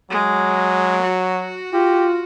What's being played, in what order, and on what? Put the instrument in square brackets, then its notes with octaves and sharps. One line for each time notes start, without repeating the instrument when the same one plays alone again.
[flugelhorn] F#3 [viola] G#3
[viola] F#4
[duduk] F4 [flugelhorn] G4